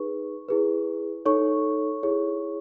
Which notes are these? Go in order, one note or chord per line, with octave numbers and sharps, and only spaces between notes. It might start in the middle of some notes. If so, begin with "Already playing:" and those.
Already playing: D#4 G#4 B4 C#6
E4 G#4 B4
D#4 A4 C#5 C#6
E4 G#4 C#5